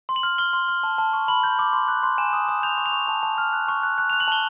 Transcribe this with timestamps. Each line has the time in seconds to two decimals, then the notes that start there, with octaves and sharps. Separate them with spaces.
0.09 C6
0.16 F#7
0.23 F6
0.38 F6 G7
0.53 C6
0.68 F6
0.83 A5
0.98 A5
1.13 C#6
1.28 B5 F#7
1.44 G6
1.59 D6
1.73 C6
1.88 F#6
2.03 C6
2.18 G#5 E7
2.33 D#6
2.48 D#6
2.63 G6 F7
2.78 C#6
2.86 F7
2.93 C#6
3.08 A5
3.23 A5
3.38 F6
3.53 F#6
3.68 C#6
3.83 F#6
3.98 F#6
4.10 F#6 F7
4.20 F#7
4.28 A5 G7